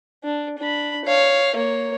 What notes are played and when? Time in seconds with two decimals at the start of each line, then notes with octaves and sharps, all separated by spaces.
0.24 D4
0.59 D4 B5
1.05 C#5 F5
1.55 A#3 C#5